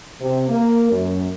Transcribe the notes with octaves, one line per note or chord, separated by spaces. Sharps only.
C3
A#3
F#2